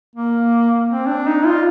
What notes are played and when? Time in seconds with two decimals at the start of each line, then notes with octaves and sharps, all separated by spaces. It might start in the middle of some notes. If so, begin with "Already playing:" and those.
0.15 A#3
0.90 C4
1.08 D4
1.27 D#4
1.46 F4